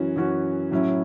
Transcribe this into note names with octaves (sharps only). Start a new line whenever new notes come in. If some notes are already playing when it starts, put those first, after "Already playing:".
Already playing: F#2 E3 C#4 F#4
F#2 E3 C#4 F#4
A2 F#3 C#4 E4